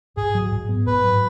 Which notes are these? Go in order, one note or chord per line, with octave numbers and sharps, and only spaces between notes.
G#2 G#4
F#3
G#2
B3
G#2 B4
F#3